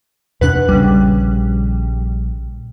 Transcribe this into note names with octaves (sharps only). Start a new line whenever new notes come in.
E2 C3 D4 B4 F#5 F#6
A#1 C#3 G3